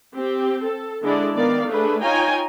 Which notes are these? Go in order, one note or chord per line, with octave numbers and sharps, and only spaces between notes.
C4 G4
A4
D3 G#3 D4 E4 D5
D#3 B3 A#4 D5 F5
A3 D4 G#4 B4
D#4 F4 C#5 G5 G#5 A#5